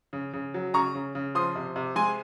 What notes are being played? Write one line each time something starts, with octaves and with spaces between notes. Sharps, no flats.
C#3
C#3
F#3
C#3 A#5 C#6
C#3
C#3
F3 C6 D#6
C3
C3
G#3 G#5 C6